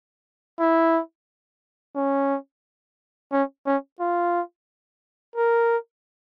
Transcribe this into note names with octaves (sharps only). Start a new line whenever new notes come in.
E4
C#4
C#4
C#4
F4
A#4